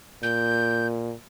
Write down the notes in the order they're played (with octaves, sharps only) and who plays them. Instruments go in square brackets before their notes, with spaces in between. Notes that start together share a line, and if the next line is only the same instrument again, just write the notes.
[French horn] A#2 [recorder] G6